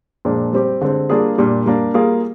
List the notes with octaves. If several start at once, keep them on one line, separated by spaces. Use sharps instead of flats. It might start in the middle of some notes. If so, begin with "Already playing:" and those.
A#2 F3 G#3 D4
G3 C4 G4
D3 G#3 C4
G3 A#3 D4 F4 G#4
A#2 G3 D4 G4
G3 A#3 D4
G3 A#3 F4 G#4